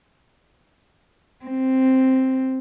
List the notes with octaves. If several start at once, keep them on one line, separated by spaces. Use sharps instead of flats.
C4